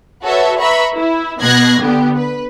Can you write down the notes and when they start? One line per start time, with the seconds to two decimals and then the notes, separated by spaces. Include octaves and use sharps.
0.25 F#4 A4 B4 C#5 E5
0.60 B4 E5 A#5 B5 C#6
0.96 E4
1.41 B2 B3 F#6 G#6 A#6 C7
1.81 D3 B3 G4
2.16 B4